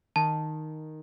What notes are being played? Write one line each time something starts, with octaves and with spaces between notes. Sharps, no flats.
D#3 A5